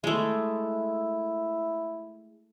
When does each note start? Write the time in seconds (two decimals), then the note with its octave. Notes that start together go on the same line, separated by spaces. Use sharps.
0.04 G#3 A3 E4